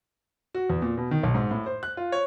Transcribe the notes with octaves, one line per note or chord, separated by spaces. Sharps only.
F#4
E2
A#2
B2
D#3
B1
G#2
A2
C5
F#6
F4
C#5